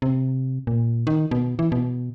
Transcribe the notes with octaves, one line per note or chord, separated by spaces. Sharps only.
C3
A#2
D#3
B2
E3
B2